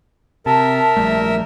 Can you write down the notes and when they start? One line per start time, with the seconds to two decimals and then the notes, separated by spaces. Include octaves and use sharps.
0.46 C3 A#4 E5 A5
0.97 A#1 G3 A3